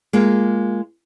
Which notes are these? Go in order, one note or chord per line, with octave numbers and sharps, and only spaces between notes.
G#3 A#3 F4